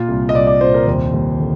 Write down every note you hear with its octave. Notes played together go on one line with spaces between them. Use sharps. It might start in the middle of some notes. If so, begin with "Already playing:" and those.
Already playing: A#2 F4
C2
D#5
C2 D5
D5
A#2 C5
A#4
D#2 C5
D#2
D3